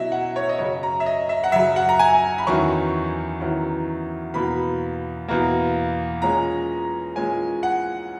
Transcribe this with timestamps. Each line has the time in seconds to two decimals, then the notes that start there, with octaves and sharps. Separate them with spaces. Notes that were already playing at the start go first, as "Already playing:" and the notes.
Already playing: B2 F#3 C#4 E4 D#5 E5
0.12 F#5
0.36 C#5
0.49 D#5
0.58 F#2 C#3 F#3 C#5
0.83 A#5
1.00 E5
1.06 D#5
1.29 E5
1.44 F#5
1.52 F#2 C#3 F#3 E5
1.76 F#5
1.89 A#5
1.99 G#5
2.38 B5
2.47 E2 D#3 F#3 C#4 E4 C#6
3.40 E2 D#3 F#3 C#4 E4
4.34 E2 B2 A#3 B5
5.28 E2 B2 A#3
6.22 A#2 G#3 C#4 A#5
7.16 A#2 G#3 C#4 G#5
7.63 F#5